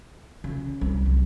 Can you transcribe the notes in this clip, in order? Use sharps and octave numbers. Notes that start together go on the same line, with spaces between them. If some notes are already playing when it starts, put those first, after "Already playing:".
C#3
C2
F#3